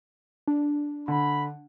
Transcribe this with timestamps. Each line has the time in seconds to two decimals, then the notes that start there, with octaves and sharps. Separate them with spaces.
0.48 D4
1.08 D3 B5